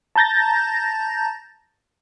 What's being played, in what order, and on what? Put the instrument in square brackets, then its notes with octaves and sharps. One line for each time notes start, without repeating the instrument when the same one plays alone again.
[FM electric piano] A5 A#5 G6 A6 A#6